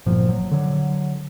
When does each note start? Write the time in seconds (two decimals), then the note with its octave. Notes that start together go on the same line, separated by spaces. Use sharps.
0.06 G1 A#2 F3
0.29 F#3
0.52 D3 F#3